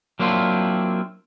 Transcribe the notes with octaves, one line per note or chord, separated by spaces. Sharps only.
F#3 A#3 C4 D4 E4 F4